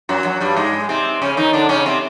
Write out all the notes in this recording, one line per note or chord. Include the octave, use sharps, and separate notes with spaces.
F#2 F#3
F#2 F#3
G2 G3
G#2 G#3
C3 C4
C#3 C#4
D#3 D#4
D3 D4
C#3 C#4
C3 C4